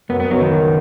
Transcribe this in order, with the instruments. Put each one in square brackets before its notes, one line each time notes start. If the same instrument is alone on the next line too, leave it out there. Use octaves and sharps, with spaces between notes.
[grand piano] F#2 [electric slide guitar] B3
[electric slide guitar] B3
[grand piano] C#3 B3 D#4 F#4 [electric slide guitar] F#3
[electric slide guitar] D#3
[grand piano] F#2